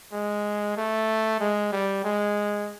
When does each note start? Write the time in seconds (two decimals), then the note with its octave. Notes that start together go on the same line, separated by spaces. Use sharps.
0.13 G#3
0.77 A3
1.40 G#3
1.72 G3
2.04 G#3